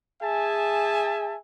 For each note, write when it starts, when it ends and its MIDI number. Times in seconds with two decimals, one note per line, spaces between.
0.22 1.36 68
0.22 1.36 76
0.22 1.36 80
0.22 1.36 81